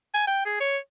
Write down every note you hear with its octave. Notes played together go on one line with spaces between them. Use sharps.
G#5
G5
G#4
C#5